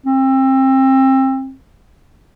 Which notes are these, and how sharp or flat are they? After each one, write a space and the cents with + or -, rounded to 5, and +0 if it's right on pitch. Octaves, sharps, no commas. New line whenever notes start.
C4 +30